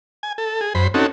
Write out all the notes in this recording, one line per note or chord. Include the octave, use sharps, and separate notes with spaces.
G#5
A4
G#4
F#2 C5 B5
C4 C#4 D#4 F#4 A4